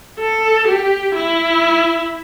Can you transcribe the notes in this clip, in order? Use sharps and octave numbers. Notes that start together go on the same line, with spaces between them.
A4
G4
E4